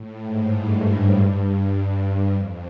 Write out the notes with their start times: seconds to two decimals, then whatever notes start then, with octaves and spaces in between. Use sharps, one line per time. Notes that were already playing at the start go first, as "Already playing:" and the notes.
Already playing: A2
0.23 G#2
0.53 G2
2.33 F2